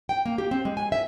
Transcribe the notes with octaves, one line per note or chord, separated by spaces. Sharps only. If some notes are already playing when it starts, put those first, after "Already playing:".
G5
A#3
G4
C4
G#3
G#5
E5